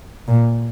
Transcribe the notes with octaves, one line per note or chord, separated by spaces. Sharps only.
A#2